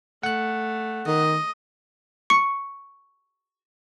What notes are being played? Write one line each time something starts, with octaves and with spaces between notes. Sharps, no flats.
A3 F#5 F#6
D#3 D#5
C#6 C#7